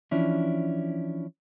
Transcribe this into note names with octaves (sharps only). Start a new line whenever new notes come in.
E3 F3 C#4 D4 E4